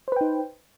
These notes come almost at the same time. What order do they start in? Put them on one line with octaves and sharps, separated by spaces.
C5 B4 G5 D#4